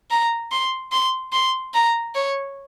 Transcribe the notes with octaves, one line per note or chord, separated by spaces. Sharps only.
A#5
C6
C6
C6
A#5
C#5